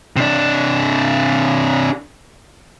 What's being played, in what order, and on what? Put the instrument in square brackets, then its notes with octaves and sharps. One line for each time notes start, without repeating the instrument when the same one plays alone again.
[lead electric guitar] C3 D4